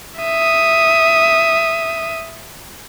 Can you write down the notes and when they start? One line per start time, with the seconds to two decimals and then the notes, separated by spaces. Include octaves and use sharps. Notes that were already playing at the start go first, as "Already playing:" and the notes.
0.20 E5 D#6